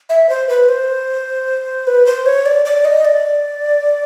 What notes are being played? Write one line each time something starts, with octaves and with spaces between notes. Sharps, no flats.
E5
C5
B4
C5
B4
C5
C#5
D5
D5
D#5
D5